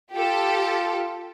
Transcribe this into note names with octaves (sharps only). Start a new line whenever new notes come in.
F4 G4 A4